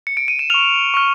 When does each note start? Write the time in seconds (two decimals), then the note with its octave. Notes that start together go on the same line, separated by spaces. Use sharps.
0.07 C#7
0.17 D7
0.28 D#7
0.39 E7
0.50 C#6 F6 F7
0.94 C#6 F6